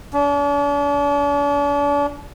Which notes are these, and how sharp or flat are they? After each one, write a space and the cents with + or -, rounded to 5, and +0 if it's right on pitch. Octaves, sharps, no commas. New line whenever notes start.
D4 -45